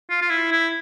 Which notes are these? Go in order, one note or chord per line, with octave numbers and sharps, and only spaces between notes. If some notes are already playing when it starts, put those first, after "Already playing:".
F4
F4
E4
E4